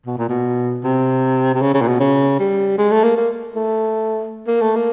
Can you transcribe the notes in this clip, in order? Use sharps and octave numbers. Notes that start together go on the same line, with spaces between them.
B2
A#2
B2
C3
C3
C#3
C#3
A#2
B2
C#3
G3
G#3
A3
A#3
A#3
A3
A#3
A3
A#3